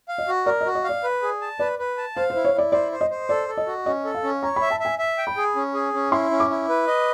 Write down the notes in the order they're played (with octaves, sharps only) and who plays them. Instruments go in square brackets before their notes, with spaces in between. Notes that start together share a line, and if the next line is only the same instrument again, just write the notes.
[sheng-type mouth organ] F5
[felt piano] D#5
[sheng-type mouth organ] F#4
[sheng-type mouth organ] A#4 [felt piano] D5
[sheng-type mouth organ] F#4 [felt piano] D#5
[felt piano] D#5
[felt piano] D5 [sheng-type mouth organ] F5
[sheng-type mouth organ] B4
G#4
A5
[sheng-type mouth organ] B4 [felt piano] D5
[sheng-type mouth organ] B4
A5
[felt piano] C5 [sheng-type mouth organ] F5
[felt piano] C5
[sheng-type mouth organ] E4
[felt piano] C#5
[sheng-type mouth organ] E4 [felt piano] D5
[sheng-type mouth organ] C5 [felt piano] D5
[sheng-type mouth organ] C5
[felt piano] D#5
[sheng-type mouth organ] C5
[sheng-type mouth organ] A4 [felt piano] D5
[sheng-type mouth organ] A4
[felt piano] D#5
[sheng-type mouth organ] F#4
[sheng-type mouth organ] C#4 [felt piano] D#5
[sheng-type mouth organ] A4
[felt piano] F5
[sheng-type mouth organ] C#4
[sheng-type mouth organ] C#5 [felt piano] A#5
[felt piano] B5
[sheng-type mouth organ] E5
[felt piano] A5
[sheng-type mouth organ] E5
[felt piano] G#5
[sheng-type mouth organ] E5
G5
[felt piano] B5
[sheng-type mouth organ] G#4
C#4
G#4
C#4
[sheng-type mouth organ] E4 [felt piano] C6
[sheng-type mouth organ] C#4
[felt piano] D6
[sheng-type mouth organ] E4
B4
D#5